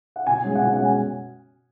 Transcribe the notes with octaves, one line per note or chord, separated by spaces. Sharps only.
F#5
B2 G#5
G#3 C#4
F#5
B2 G#5
F#5
G#3 C#4
G#5